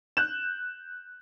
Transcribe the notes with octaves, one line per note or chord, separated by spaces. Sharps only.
F#6 G6 E7